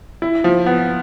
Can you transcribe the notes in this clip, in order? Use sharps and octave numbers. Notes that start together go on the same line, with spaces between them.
E4
F3
B3